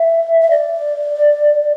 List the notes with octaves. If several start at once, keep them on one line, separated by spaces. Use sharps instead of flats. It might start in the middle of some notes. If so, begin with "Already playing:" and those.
Already playing: E5
E5
D5